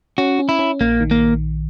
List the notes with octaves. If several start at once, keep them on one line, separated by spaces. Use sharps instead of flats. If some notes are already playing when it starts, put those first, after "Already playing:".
C#4 F#4
C#4
E4
C#4
A#1 A#3
D#3
A#3